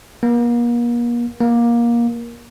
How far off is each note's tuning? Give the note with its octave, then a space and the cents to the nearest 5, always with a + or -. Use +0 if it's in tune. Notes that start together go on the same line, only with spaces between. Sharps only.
A#3 +40
A#3 +20